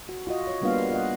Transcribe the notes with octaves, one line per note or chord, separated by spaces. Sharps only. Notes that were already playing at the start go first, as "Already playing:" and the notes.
F#4
F4 F#4 D#5
C#5
G3 A#3 B3 D4 F4 F5
F4 D#5 F#5